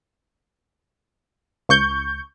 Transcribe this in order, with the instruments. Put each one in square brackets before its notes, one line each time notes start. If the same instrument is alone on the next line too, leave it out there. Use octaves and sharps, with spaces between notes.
[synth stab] C#2 C#6 G6